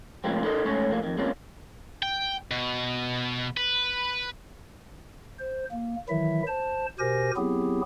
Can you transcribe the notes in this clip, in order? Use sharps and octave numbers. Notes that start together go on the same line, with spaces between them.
A2 C3 F3 G#3 A#3 C4
D#4 E4 A4 A#4 C5 D#5
G#2 A3 C#4 C#5
A2 F3 A#3
F2 D#3
G#3 A#3 C4 C#4 F4
G5
B2
B4
C5
A#3
D#3 E3 F#3 E4 E5
C5 A5
B2 G4 A#4 C5 G#5 A#6
F#3 B3 C4 E4 G4 G#4